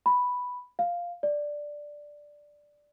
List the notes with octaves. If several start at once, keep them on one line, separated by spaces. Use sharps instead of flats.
B5
F5
D5